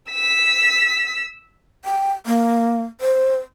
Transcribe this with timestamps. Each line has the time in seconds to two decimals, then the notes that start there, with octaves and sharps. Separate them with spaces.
0.11 E6 B6
1.85 G5
2.26 A#3
3.01 C5